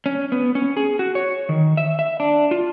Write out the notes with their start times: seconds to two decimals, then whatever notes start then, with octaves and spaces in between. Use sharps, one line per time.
0.06 C#4
0.32 B3
0.55 C#4
0.77 G#4
0.99 F#4
1.15 C#5
1.49 D#3
1.77 E5
1.99 E5
2.20 D4
2.51 F4